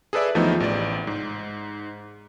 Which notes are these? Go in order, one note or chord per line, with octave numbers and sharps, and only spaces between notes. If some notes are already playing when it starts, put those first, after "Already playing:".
G#4 A4 B4 D5 E5
D#2 E3 F3 A3 B3 D#4
A1 C3 D5
G#2